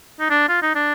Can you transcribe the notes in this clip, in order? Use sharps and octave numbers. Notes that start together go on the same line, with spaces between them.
D#4
D4
F4
D#4
D4